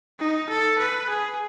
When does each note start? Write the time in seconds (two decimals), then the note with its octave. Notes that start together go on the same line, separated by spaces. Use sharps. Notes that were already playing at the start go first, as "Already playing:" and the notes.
0.19 D#4
0.49 A4
0.78 B4
1.09 G#4